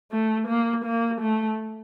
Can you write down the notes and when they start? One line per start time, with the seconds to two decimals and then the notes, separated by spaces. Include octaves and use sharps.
0.12 A3
0.48 A#3
0.85 A#3
1.21 A3